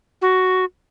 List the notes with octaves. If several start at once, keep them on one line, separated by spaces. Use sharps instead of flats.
F#4